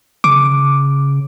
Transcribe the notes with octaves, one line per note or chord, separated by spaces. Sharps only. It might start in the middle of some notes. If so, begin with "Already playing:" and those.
C#3 D6